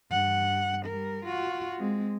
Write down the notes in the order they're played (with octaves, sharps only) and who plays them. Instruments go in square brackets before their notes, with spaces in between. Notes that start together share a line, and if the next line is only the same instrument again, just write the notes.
[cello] G2 F#5
G3 A#4
F4 F#4
G#3 C4